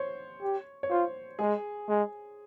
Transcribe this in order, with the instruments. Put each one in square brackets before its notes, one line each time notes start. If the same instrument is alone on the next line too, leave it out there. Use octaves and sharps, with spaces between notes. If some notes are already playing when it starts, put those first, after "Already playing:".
Already playing: [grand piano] C5 C#5
[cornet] G4
[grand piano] C#5
[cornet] F4 [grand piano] C5
[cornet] G#3 [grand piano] G#4
[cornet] G#3